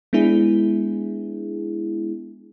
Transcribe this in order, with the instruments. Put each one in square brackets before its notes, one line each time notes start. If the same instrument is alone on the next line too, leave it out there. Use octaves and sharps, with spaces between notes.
[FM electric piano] G#3 B3 D4 E4 G#4